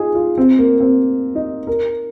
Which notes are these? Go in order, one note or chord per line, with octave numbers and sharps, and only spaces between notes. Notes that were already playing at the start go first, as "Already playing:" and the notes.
Already playing: D#4 F4 G#4
F4
C4
A#3
C4
D#4
A#4